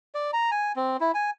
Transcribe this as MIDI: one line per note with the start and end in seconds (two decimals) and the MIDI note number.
0.15 0.31 74
0.33 0.50 82
0.51 0.72 80
0.76 0.97 60
1.00 1.12 64
1.14 1.30 80